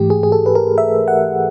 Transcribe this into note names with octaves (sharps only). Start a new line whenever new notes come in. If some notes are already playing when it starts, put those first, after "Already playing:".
Already playing: G#2 E3 A3 G4
G#4
G#4
A4
B4
A#4
E5
F#5